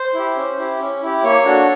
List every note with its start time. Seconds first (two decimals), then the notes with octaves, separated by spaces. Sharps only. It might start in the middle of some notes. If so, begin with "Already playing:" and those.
Already playing: C5
0.14 E4 G4
0.36 C#4
0.58 E4 G4
0.80 C#4
1.02 E4 G4
1.24 A#3 C#5
1.45 D4 F#4 A4